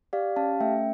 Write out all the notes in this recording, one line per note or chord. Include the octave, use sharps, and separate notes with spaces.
G4 D5 F5
C#4 F5 A5
A3 E5 G5